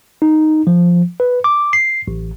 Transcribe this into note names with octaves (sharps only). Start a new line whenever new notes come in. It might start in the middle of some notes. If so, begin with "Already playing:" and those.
D#4
F3
B4
D6
C7
A1